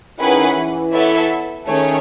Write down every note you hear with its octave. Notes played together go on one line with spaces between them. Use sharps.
D#3 C#4 E4 G#4 B4 F#5
E3
B3 E4 A4 C#5 E5
D#3 A3 C#4 G#4 C#5